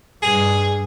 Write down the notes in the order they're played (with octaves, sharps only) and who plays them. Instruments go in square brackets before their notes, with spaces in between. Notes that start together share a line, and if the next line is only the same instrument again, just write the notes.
[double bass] G2 [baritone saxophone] G#4